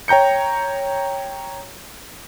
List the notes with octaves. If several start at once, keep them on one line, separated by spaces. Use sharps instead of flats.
C#5 G5 A#5 G6 C#7